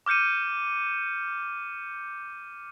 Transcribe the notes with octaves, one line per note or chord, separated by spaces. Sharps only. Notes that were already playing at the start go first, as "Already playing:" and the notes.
D6 F6 G6 C#7 D#7